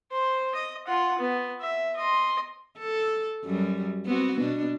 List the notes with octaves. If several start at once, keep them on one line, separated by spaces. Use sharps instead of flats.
C5
D#5
F4 F#5
B3
E5
D#5 C6
A4
F#2 F#3 G3
B3 C4 F#4
B2 D4